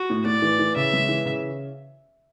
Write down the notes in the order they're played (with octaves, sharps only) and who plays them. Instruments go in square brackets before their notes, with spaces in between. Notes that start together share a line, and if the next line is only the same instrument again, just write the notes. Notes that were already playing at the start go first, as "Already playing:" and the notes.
Already playing: [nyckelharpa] F#4
[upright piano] A2
[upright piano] A2 [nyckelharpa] D5
[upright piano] E3
E3
[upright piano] C#3 [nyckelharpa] E5
[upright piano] G#3
E3
C#3